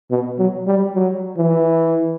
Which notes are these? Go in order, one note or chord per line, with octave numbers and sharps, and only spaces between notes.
B2
F#3
G3
F#3
E3